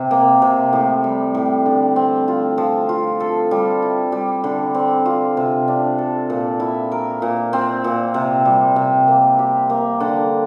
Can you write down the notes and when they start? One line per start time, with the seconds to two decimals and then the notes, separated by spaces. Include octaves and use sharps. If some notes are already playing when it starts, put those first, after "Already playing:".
Already playing: C3 C4 G4
0.11 A#3
0.42 C3
0.73 A2
1.04 G3
1.35 A2
1.66 D3
1.96 C4
2.28 F4
2.58 F3
2.89 F4
3.20 A4
3.51 G3
3.82 E4
4.12 G3
4.44 D3
4.75 C4
5.06 F4
5.37 C3
5.68 D4
5.98 A4
6.30 A#2
6.60 E4
6.92 A#4
7.22 A#2
7.53 C4
7.84 A#2
8.14 C3
8.45 G3
8.76 C3
9.08 A#3
9.39 G4
9.70 A#3
10.00 D3